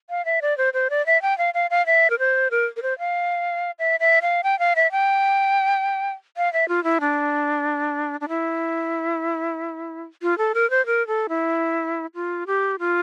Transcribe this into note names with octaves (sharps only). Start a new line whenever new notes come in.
F5
E5
D5
C5
C5
D5
E5
G5
F5
F5
F5
E5
A#4
C5
A#4
A#4
C5
F5
E5
E5
F5
G5
F5
E5
G5
F5
E5
F4
E4
D4
D4
E4
F4
A4
A#4
C5
A#4
A4
E4
F4
G4
F4